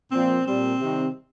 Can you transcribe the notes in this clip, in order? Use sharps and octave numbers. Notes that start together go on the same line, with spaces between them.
A#2 F3 C4
A#2 G3 C4
C3 D#3 G3